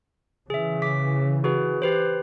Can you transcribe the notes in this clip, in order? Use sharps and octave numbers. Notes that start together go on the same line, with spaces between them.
C#3 E3 G#4 E5
D6 B6
F#4 G#4 B4
G4 B4 C5